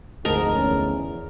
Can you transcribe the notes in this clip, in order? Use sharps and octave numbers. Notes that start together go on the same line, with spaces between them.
F1 D2 G#2 A#4 D#5 A5
E2 C#4